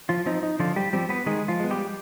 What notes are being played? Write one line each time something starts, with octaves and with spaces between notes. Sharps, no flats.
F3 F4
F3 C4 D#4
D#4
D3 F3 F4
G3 G4
F3 G3 C4 G4
B3 B4
D#3 G#3 G#4
F3 F4
G#3 B3
G3 G4